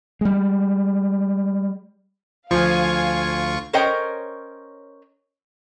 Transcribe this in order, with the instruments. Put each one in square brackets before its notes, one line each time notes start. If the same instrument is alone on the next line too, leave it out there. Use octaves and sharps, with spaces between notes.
[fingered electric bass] G3 G#3
[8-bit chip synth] D2 F4 C#6 [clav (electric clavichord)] F3 [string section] F5 G#5
[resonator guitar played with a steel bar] C#4 A#4 C5 C#5 D#5 G5